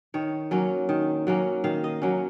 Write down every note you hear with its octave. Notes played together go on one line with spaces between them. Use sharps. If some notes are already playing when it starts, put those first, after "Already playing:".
D#3 C#5
F#3 A#3 C#4
D#3
F#3 A#3 C#4
D#3 F5
D#5
F#3 A#3 C#4